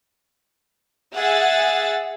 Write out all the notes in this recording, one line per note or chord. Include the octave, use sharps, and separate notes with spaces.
G#4 E5 F#5 A6